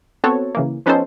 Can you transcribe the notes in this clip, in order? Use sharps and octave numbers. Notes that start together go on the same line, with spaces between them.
B3 C4 F#4 A4 C#5
C#3 E3 A#3
F3 B3 C#4 D#4 A4 C5